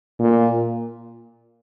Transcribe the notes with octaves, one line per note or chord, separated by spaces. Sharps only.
A#2